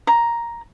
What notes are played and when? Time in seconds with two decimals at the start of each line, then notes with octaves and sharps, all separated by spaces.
0.07 A#5